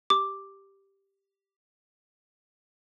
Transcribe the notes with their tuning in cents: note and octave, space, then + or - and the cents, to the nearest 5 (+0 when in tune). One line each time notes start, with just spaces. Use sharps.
G4 +0 D6 +0